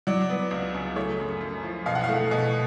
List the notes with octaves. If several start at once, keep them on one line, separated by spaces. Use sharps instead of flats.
F#3 D5
B3
C#2
C#3
A3 C#5
F#2
F#2
F3
B2 F5
F#5
F5
A3
B2